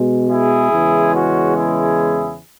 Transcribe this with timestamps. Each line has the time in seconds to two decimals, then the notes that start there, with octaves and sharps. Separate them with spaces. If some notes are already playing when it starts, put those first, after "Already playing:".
Already playing: B2 G#3
0.30 E4 G#4
0.72 E2 C#3 E3 G#3
1.14 C#4 F#4
1.55 E4 G#4